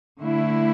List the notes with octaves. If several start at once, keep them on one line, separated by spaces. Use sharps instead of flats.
D3 A3 E4